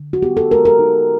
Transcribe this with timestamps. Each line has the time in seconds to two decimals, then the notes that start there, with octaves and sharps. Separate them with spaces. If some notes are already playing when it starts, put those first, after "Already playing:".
Already playing: D3
0.13 F#4
0.23 B3 G4
0.37 A4
0.51 G#3 A#4
0.65 A#4
0.79 D#4